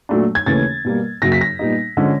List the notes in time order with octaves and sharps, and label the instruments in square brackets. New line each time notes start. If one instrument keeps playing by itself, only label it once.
[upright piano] A#2 F#3 A3 D4
G#6
D#2 C#3 E3 A3 C#4 A6
B2 G3 A#3
F#2 C#3 F#3 A#3 A#6
B6
A#6
A#2 G3 B3 D#4
D3 F3 G#3 C#4